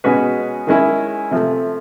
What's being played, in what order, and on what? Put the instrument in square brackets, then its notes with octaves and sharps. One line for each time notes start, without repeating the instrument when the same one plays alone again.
[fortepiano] B2 G#3 C#4 F#4 B4
D#3 G#3 C#4 E4 G#4
C3 F3 A3